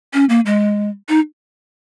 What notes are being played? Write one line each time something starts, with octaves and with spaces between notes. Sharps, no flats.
C#4
A#3
G#3
D#4